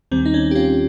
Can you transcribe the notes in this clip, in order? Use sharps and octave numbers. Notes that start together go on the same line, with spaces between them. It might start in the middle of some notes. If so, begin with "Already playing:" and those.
D#2 D#3 G3 C4
D#4
C#4
G4
C#4 F4